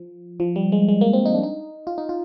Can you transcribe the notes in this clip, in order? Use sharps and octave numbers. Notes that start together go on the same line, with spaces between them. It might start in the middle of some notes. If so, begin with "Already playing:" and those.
Already playing: F3
F3
G3
G#3
G#3
A#3
C4
D#4
D4
D#4
F4
D#4
F4